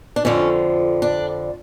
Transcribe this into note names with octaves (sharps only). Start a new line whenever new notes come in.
D4
F2 D3 F3 C#4
D4